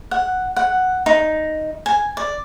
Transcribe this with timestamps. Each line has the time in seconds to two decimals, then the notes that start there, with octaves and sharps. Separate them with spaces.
0.11 F#5
0.56 F#5
1.06 D#4
1.86 G#5
2.17 D5